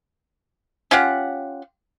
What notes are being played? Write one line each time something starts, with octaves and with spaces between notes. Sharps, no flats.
C#4 F4 G4 F#5